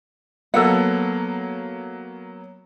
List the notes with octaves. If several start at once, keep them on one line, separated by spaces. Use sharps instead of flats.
F#3 A#3 B3 A4 F#5